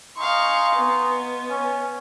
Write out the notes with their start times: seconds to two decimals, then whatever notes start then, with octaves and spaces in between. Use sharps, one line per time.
0.17 D#4 F5 G#5 C6 C#6
0.76 B3
1.50 C#4